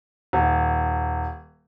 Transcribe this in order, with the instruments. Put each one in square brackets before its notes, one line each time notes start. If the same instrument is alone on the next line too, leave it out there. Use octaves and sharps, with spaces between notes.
[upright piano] D#1